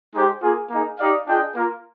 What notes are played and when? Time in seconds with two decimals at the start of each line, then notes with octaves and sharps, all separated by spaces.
0.13 G#3 D#4 G4 C5
0.41 A#3 F4 G#4
0.69 A#3 D#4 G#4
0.98 D#4 G4 D5 F5
1.26 D4 F4 G#4 D#5 G5
1.55 A#3 F4 A#4